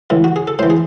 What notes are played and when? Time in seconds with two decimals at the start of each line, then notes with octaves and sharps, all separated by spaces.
0.10 A2 E3
0.24 F#4
0.36 G#4
0.48 A4
0.59 A2 C5
0.63 E3
0.70 G#4